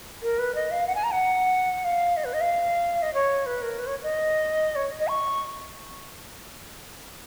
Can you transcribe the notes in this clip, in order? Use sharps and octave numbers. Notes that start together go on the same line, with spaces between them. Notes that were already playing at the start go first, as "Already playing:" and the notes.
A#4
B4
D#5
F5
F#5
G#5
A#5
F#5
F5
D#5
B4
D#5
F5
D#5
C#5
B4
A#4
B4
C#5
D#5
C#5
D#5
C#6